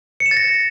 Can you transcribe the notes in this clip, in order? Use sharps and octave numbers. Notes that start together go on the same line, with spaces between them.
C#7
E7
A6
A#6